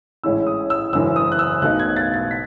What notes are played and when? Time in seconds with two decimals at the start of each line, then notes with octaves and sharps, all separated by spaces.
0.24 A1 A2 G#3 C#4 E4 E6
0.47 D#6
0.70 E6
0.93 F#1 F#2 E3 E6
1.16 D#6
1.32 F#6
1.39 E6
1.61 B1 B2 A3 D#4 F#6
1.80 G#6
1.96 A6
2.14 A6
2.31 B6